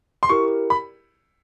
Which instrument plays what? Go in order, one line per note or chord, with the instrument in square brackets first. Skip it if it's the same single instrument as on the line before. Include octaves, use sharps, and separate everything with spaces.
[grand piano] C6
[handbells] E4 G4 A#4 [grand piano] C#6
[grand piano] B5